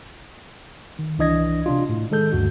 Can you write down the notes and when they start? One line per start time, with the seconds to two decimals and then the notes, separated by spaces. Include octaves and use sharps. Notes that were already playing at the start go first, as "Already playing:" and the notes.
0.99 D#3
1.18 C2 E3 D4 D#5 G#6 A#6
1.66 C3 D4 F4
1.89 A2
2.11 D#3 G#3 A4 G6
2.32 D2 G2 F#4 G6